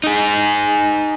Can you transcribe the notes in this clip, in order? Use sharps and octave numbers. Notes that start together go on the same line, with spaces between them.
D#4 G#4